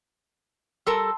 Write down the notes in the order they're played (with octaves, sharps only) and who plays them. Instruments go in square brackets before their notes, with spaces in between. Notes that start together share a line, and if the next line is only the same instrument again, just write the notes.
[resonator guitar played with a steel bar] G3 A4 A#4 [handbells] A5 C6 E6